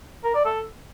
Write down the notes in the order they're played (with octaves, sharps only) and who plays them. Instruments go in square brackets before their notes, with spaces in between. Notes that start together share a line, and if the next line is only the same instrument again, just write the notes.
[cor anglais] A#4
D5
A4